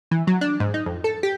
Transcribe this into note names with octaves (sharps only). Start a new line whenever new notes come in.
E3
F#3
D4
G#2
D#4
F2
A4
G4